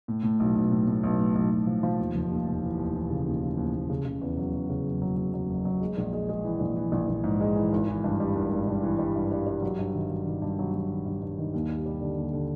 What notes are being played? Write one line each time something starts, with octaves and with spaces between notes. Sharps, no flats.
A2
A2
B1
B1
A2
A2
B1
A2
B1
B1
F3
F3
D#2
F1
D#2
F1
E3
D#2
E3
C#3
D#2
E3
D#2
D#2
C#3
C#3
E2
F#3
F#3
C#3
F#1
F#3
F#3
F#3
F#1
F#3
G#3
A#1
G#3
G#3
E3
A#1
E3
A#1
A#1
G#2
G#3
E3
G#1
E3
G2
G3
G#1
G#1
G2
E3
G3
G2
G3
G3
F#3
G2
D#3
F#3
D#3
G2
F#3
F#3
D#3
G2
G2
D#3
D#2
G3
G3
D3
D#2
D3